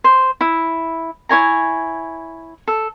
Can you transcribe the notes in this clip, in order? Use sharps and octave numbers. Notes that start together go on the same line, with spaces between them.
C5
E4
E4 C#5 G#5 A#5
A4